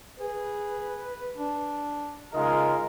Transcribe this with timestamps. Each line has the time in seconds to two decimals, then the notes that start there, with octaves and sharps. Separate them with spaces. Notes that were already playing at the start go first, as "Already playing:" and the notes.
0.20 G#4 B4
1.37 D4
2.34 C#3 G#3 D#4 F4 A#4 D#5